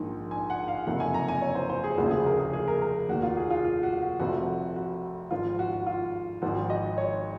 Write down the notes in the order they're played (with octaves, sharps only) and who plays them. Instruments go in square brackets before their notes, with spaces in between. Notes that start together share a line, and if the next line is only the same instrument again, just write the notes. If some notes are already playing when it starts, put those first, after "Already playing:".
Already playing: [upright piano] A#1 G#2 D#3
G#5
F#5
F5
F#1 F2 C3 D#3 F#5
G#5
A#5
G#5
C#5
C5
C5
G#4
F1 D#2 C#3 F3 F#4
G#4
A#4
G#4
G#4
A#4
A#4
F1 D#2 D#3 F#4
F4
G#4
F4
F4
F#4
F#4
F1 F2 C3 F3 F#4
F#4
G#1 G#2 F3 F4
F#4
F#4
F4
G#1 G#2 F3 F#4
D#5
C#5